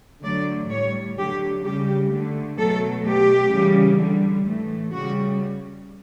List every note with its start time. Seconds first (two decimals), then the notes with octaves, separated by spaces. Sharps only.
0.23 D3 F#3 A3 D5
0.70 A2 G3 C#5
1.17 D3 F#3 A3 G4
1.64 C#3 G3 G4
2.11 D3 A3
2.58 B2 F#3 A3 A4
3.05 B2 A3 G4
3.51 C#3 E3 G3
3.98 D3 G3
4.45 A2 E3 A3
4.92 C#3 G3 F#4